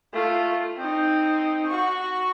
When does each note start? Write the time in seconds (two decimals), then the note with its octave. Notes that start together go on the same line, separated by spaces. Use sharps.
0.13 A3 F4
0.78 C4 D#4
1.66 F#4 C#6